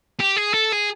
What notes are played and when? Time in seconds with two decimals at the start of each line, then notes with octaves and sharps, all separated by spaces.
0.20 G4
0.37 G#4
0.54 A4
0.72 G#4